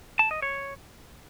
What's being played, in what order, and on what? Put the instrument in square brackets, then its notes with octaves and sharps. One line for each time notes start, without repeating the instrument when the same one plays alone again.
[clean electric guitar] A5
D#5
C#5